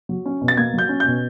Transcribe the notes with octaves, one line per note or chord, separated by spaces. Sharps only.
F#3
C#4
B2
A6
A#3 G#6
F#3 G6
C#4
G6
B2